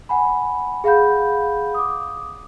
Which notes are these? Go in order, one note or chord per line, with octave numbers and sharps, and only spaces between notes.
F#5 G#5 B5
G#4 F5 F#5 B5 G6
D6 D#6